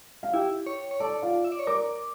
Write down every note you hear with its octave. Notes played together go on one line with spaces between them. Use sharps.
F5
E4 G4 G5
C#5
C#5
A4 D5 A5
F4 F5
E5
D5
C#5
A#4 D5 D6